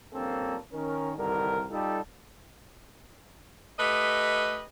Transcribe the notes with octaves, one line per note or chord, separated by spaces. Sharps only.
A#1 G2 A#3 C4 C#4 A4
D#3 C#4 A#4
C2 G2 D3 D#3 A#4
G3 D#4 F4 G4 A4
A3 G4 B4 D#5